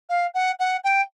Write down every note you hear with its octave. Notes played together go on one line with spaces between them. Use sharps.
F5
F#5
F#5
G5